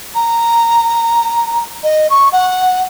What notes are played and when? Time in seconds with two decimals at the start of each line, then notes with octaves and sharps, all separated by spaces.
0.15 A#5
1.83 D#5
2.10 C#6
2.33 F#5